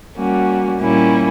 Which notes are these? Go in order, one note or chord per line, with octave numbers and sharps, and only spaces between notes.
G3 A#3 C#4 F#4
A#2 G3 A#3 C#4 E4